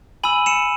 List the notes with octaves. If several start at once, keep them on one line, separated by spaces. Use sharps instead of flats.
G#5 B5 E6 D#7 F#7
C#7 E7